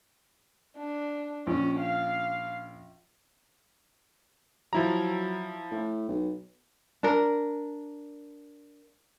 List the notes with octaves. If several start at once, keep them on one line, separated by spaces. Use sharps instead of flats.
D4
A#1 C#4
F5
F3 F#3 E4 A#5
A2
B1
D4 A#4